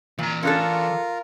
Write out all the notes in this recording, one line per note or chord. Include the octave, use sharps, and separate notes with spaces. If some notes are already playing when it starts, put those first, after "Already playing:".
A#2 E3 A#5
C#4 D4 F4 A4 A#4